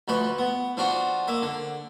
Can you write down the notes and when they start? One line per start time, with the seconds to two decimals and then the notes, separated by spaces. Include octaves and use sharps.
0.08 D2 F3 B4 C#6
0.38 B3
0.77 F3 D4 F4 F#4
1.28 A#3 E5
1.42 D3